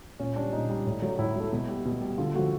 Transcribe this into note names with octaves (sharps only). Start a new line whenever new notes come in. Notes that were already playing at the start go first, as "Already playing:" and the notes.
A#2 C#4
G3 D4
A#2 D#4
G3
A2
F#3 A3
A2 E4
F#3 A3
B2
G3
B2
G3
D3 F4
F3 A3 F#4